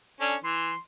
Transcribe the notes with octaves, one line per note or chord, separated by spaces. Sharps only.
C#4 D4 A4
E3 C6